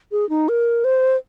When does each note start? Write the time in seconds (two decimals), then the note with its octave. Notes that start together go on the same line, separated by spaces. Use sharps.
0.12 G#4
0.29 D#4
0.49 A#4
0.84 C5